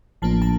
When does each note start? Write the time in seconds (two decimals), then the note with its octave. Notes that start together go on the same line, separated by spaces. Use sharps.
0.22 A1 A2 F3 A#3 D4 A5
0.42 A5